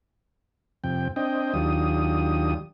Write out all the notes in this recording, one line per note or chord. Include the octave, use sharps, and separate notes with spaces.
F2 C3 G5
C4 D4 D#5 G5
D#2 F#3 D4 F4 G4 D#6